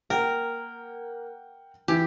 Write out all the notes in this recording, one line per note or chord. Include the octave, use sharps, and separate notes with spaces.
A#3 A#4 F#5 G5
E3 E4 G4